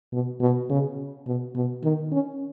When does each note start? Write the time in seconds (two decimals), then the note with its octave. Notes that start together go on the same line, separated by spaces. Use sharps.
0.13 B2
0.41 B2
0.70 C#3
1.27 B2
1.56 B2
1.84 D#3
2.12 C#4